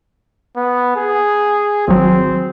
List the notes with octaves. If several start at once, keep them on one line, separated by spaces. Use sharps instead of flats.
B3
G#4
G#1 F#3 C4